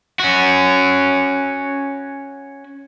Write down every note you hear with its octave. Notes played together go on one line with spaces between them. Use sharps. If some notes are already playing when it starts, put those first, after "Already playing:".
C#4 F#4